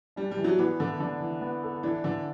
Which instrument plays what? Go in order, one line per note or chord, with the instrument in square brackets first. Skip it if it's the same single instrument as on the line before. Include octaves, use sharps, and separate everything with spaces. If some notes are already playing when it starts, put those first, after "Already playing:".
[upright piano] G3 [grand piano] D4
[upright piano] G3
[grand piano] E3
[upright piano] F#3
[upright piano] E3 [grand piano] B3
[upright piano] D3 [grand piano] A4
[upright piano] D3 [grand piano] D4
[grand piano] E3
B3
A4
[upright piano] E3 [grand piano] D4
[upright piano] D3 [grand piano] E3